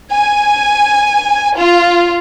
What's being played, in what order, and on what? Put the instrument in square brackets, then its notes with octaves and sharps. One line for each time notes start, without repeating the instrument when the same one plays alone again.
[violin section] G#5
F4